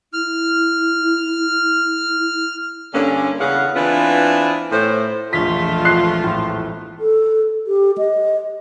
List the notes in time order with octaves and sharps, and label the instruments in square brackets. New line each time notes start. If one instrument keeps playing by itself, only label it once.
[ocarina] E4 [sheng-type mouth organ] F6
[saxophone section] G2 D3 A#3 C#4
E2 C#3 F5 F#5
E3 B3 C4 D4 F4
A2 C5
[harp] E1 A#1 [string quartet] F3 A3 [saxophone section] F4 [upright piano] B6
[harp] C4 [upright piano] F#6 C7
[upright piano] A2
[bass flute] A4
G4
D#5